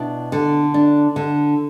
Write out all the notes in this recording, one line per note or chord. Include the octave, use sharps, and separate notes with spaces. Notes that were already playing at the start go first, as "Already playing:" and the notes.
Already playing: B2 D4 E4
D3
D4
D3